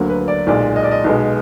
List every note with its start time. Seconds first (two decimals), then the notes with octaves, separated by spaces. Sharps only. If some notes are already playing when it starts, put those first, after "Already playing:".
Already playing: D2 D3 F#3 A#3
0.09 B4
0.28 D5
0.47 B1 A#2 G#3 D5
0.76 D#5
0.83 D5
0.91 D#5
1.04 B1 B2 G#3